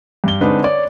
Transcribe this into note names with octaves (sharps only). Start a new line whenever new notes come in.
G2 G7
D3 G#3 C4 D4 D#4 B4
C#5 D5